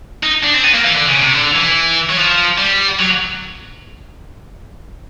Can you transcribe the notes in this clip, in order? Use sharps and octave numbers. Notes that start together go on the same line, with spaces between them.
D#4
D4
C4
B3
A#3
E3
D3
C#3
C3
D3
E3
F#3
F3
G3
F#3